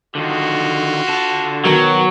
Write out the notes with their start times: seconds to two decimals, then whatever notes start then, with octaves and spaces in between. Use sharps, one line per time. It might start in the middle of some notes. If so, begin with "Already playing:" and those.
0.15 D3 D#3 F4 F#4
1.08 D3 A5
1.65 B2 D#3 F#3